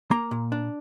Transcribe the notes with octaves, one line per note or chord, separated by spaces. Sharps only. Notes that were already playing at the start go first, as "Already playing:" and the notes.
A#3 A#5
A#2
D4